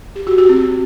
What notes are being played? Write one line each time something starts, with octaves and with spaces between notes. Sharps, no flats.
G4
F#4
F#4
C4